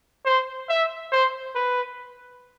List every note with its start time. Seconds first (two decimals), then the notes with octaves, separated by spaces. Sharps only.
0.25 C5
0.70 E5
1.12 C5
1.55 B4